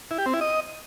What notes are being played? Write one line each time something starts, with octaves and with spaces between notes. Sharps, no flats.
E4
G4
C4
E4
D#5